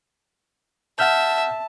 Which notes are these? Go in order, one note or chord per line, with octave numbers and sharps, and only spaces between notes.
E5 F#5 A5 F6 G6